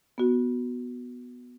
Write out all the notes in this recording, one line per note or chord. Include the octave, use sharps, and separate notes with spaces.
B3 F#4